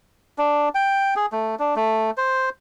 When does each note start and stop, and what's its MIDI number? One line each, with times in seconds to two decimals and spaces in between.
0.38 0.69 62
0.75 1.14 79
1.16 1.26 68
1.32 1.55 57
1.59 1.75 62
1.76 2.11 57
2.17 2.50 72